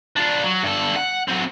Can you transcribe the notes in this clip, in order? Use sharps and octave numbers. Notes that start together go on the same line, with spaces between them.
D4 F4
F#3
G2 A4
F#5
F#3 C4